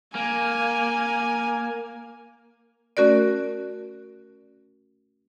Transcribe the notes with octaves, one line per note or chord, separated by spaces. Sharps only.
A#3 G#5
A3 C#4 F#4 A#4 D5